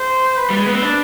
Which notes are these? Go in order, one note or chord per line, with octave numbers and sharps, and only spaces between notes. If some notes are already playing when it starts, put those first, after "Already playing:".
Already playing: C5
B4
G3
G#3
B3
C4
D4